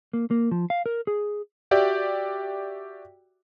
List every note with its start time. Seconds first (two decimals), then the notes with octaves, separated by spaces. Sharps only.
0.13 A#3
0.31 A#3
0.51 F3
0.70 F5
0.86 A#4
1.07 G#4
1.71 F#4 G4 D5 E5 G5